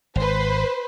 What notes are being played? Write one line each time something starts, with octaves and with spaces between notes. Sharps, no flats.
G#1 B4 C5